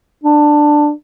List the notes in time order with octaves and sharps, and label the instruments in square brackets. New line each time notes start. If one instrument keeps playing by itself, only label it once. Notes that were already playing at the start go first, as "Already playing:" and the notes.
[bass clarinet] D4